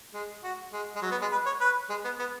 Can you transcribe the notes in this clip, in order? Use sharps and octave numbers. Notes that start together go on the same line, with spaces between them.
G#3
F#4
G#3
G#3
F#3
B3
G#3
B4
C#5
B4
G#3
B3
B3